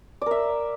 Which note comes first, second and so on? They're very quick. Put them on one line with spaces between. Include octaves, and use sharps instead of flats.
D5 A#4 E5